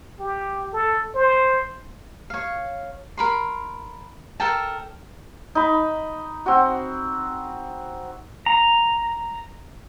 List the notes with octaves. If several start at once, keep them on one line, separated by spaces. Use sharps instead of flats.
G4
A4
C5
C#5 F5
A#4 B5 C6
A4 A#4 G5 A5
D#4 B5
C4 F#4
A#5